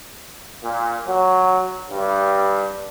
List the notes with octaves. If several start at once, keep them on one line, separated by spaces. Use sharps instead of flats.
A#2
F#3
G2